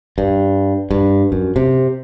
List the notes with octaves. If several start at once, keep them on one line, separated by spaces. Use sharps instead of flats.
G2
G2
F#2
C3